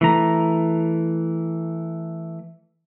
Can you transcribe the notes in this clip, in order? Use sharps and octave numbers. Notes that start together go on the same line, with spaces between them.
E3 A3 A#5